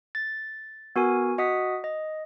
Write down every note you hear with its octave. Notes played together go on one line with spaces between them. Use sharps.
A6
B3 F#4 A#4 G#5
F#4 D#5 F#5 D#6 B6
D#5